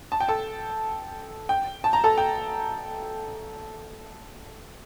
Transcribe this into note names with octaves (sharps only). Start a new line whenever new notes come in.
A5
G5
A4 A5
G5
A5
A#5
A4 A5
G5